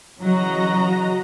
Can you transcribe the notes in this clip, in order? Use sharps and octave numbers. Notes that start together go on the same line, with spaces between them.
C#3 E3 F#3 F#4 D#5 A#5